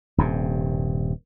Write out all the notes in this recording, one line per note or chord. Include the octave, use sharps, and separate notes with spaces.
D#1 G2 C3